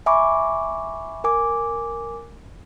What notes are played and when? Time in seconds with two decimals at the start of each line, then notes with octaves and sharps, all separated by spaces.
0.06 E5 G#5 B5 C#6 D6
1.24 A#4 G#5 D6